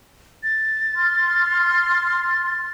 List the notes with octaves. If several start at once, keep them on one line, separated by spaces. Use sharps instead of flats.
A6
C6 F6